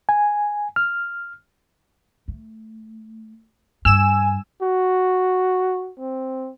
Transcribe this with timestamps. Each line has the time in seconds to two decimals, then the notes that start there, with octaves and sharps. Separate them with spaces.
0.09 G#5
0.76 F6
2.28 A3
3.85 G2 G#5 E6 E7
4.62 F#4
6.00 C4